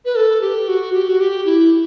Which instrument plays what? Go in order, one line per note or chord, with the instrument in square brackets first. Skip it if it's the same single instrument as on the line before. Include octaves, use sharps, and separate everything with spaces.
[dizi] B4
A4
G4
F#4
G4
F#4
G4
E4